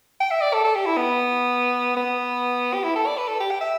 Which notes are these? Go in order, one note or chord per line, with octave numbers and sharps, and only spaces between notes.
G5
E5
D5
A4
A4
G4
E4
B3
B3
G4
E4
A4
D5
B4
A4
G4
G5
E5